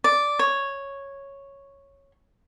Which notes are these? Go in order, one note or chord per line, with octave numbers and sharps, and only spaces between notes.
D5
C#5